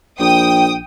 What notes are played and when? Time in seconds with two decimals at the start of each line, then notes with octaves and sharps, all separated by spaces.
0.20 A#1 G5 D#6